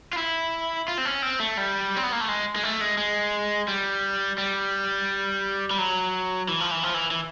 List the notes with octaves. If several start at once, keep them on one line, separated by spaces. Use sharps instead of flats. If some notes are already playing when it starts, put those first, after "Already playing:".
F4
E4
F4
C4
C#4
C4
A3
G3
C4
B3
A#3
A3
G#3
G#3
A3
G#3
G#3
G3
G3
G3
F#3
E3
F3
E3
F3
E3
E3